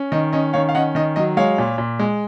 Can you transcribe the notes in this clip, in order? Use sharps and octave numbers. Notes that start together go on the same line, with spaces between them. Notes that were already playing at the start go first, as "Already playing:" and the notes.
Already playing: C#4
D#3 D#5
C#4 D#5
D#3 C#5 F5
F5
C#4 D#5 F#5
D#3 D#5
F#3 D#5
G#3 C#5 F5
A#2
A#2
G#3